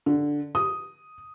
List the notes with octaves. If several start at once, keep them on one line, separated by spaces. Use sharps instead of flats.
D3
D#6